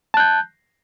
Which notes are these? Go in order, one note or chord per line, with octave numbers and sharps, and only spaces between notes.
A5 F#6 G6